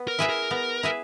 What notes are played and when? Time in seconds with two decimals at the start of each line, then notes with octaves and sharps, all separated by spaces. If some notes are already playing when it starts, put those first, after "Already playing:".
Already playing: B3
0.08 A#4
0.19 E4 G#4 B4 E5
0.29 A#4
0.51 B3
0.83 E4 G#4 B4 E5